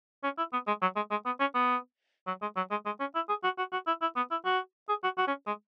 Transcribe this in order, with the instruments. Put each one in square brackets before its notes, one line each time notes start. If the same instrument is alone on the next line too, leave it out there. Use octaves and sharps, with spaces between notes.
[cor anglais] C#4
E4
B3
G#3
F#3
G#3
G#3
B3
C#4
B3
F#3
G#3
F#3
G#3
G#3
C#4
E4
G#4
F#4
F#4
F#4
E4
E4
B3
E4
F#4
G#4
F#4
F#4
C#4
G#3